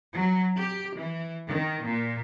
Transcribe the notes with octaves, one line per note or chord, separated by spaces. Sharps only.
F#3
G4
E3
D#3
A#2